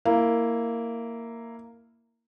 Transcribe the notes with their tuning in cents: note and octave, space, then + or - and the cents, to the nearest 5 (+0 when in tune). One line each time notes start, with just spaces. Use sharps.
A#3 -10 E4 +0